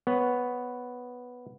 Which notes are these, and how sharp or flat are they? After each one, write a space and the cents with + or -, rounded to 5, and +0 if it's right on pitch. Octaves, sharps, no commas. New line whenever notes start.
B3 +0 C#5 +0